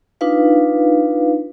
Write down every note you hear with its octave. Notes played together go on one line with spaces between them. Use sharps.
D4 D#4 F4 B4 F5